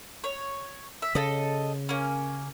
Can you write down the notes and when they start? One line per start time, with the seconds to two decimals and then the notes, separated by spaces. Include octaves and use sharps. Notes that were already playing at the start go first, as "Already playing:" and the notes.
0.24 C#5
1.02 E5
1.15 C#3 A4 D#5
1.89 A#3 C#4